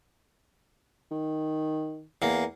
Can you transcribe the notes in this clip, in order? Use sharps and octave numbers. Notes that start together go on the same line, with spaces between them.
D#3
E2 A#3